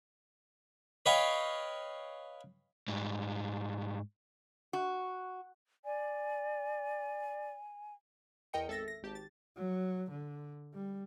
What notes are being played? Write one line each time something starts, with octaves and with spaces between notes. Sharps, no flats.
B4 C#5 D#5 F5 G5
G#2 G3
F#4
D5 G#5
E2 A#4 D#5 G5 C#7
G#1 A4 E5 E6 A6 A#6
A#6
G#1 G4 A5
A6
F#3
D3
G3